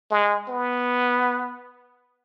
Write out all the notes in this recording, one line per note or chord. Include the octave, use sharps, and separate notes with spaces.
G#3
B3